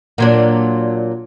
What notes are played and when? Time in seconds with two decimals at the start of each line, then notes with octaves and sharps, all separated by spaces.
0.18 A#2 F#3 D4